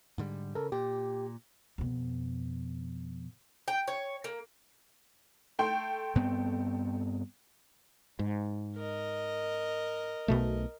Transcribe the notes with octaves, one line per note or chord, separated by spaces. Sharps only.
G#2 D3 G3
C#3 A4 A#4
A#2 G4
F2 B2
G5
C#5
A#3
A3 G5 C6
G2 B3 C4
G#2
A#4 D#5
B1 B2 A3